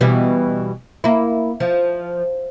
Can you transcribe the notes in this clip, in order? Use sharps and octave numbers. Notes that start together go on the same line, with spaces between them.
B2 E3 G3
A#3 E4
F3